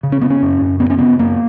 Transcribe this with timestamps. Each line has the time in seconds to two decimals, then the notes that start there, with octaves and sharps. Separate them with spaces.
0.03 C#3
0.12 C#4
0.21 C#3 B3
0.30 C#4
0.42 F#2
0.62 F#2
0.80 C#3 B3
0.90 C#4
0.98 C#3 B3
1.19 F#2 A#3